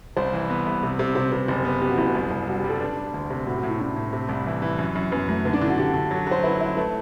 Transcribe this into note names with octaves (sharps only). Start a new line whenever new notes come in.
C2 C5
E3
B3
C2
C3
C3
C3 C5
C3 B4
F#1 G4
B3
B3 G4
F#4
F#1 E4
F#4
C2
C2
G3 F#4
G4
G3
A4
D4 B4
D4
D2
C3
A2 F#4
F#4
A2
E4
A2 D4
A2
C3
C2
E3
E3
F#2
F#2
F#2 B3
F#2 A3
D3 B3
D4
D3 E4
F#4
D3 G4
D3
F#3
F#3 C5
E4 B4
E4
A3 B4